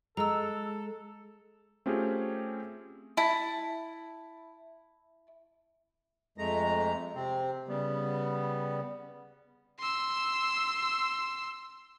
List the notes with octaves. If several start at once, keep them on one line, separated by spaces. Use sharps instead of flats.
G#3 A4 A#5 E6
A3 C4 C#4 F4 G4 G#4
E4 A5
F2 G#3 A3 A#5
C3 C4
C#3 G3 B3
C6 E6